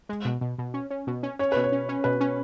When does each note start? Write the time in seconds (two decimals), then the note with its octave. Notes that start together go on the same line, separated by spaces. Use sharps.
0.09 G#3
0.25 B2
0.41 B2
0.58 B2
0.74 C#4
0.90 C#4
1.07 B2
1.23 C#4
1.39 C#4 C#5
1.52 B2 B4
1.64 C#5
1.72 C#4
1.89 C#4
2.04 B2 B4
2.20 C#4